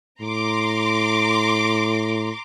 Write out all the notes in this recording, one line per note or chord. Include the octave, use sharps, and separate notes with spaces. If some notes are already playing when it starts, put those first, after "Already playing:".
A2 A#5 C6 D6